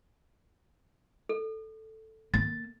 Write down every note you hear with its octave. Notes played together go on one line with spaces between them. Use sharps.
A4
A#3 A6